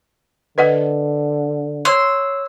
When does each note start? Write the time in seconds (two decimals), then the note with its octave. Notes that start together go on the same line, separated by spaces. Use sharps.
0.58 D3 B4 D#5 F#5
1.85 C#5 C6 E6 F#6